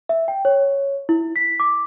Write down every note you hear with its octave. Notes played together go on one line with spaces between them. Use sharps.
E5
G5
C#5
E4
B6
D6